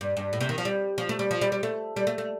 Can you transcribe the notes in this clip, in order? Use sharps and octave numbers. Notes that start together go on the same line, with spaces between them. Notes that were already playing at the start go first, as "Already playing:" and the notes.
G2
G2
A2
C3
D#3
F3
G3
F3
A3
G3
F3
G3
G3
A3
G3
A3
A3